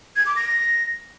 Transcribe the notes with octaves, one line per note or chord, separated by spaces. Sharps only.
G#6
D6
A#6